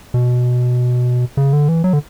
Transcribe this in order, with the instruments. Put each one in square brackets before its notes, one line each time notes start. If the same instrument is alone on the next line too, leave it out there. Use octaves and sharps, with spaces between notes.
[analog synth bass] B2
C#3
D3
E3
F#3
D3